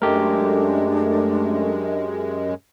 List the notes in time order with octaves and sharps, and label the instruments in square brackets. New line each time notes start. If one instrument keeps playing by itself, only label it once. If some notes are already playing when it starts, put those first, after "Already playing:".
[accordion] F#2 G#3 [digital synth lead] A3 [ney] D4 [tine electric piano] G4 A#4